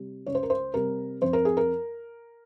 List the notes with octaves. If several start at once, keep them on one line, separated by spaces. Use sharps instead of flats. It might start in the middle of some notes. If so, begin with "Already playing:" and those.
Already playing: C3 G3
C#2 C#5
C5
A#4
C5
C3 G3 A#4
F2 C5
A#4
G#4
A#4